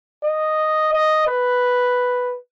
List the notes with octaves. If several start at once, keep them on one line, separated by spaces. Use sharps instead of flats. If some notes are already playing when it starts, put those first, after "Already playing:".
D#5
D#5
B4